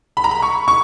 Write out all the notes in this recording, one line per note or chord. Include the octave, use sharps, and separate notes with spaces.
B5
A#5
B5
C#6
C#6